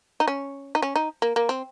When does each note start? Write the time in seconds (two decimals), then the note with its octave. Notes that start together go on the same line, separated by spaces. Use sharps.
0.20 D#4
0.28 C#4
0.75 D#4
0.82 C#4
0.96 D#4
1.22 A#3
1.36 A#3
1.49 C4